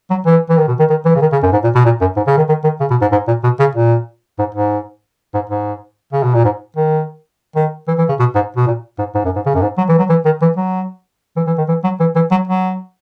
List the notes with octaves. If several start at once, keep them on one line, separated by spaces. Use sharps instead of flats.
F#3
E3
E3
D#3
B2
D#3
D#3
E3
C#3
D#3
C#3
F#2
G#2
A#2
B2
A#2
F#2
G#2
C#3
D#3
D#3
D#3
C#3
B2
G#2
G#2
A#2
B2
C#3
A#2
G#2
G#2
G#2
G#2
C#3
B2
A#2
G#2
D#3
D#3
E3
E3
C#3
B2
G#2
B2
A#2
G#2
G#2
F#2
G#2
C#3
F#2
G#2
F#3
E3
F#3
E3
D#3
E3
F#3
E3
E3
D#3
E3
F#3
E3
E3
F#3
F#3